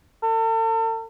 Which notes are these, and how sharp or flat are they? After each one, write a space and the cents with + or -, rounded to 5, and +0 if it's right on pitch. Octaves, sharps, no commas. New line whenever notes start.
A4 +40